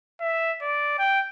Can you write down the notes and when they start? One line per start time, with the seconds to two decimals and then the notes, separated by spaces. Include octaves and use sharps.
0.21 E5
0.62 D5
0.99 G5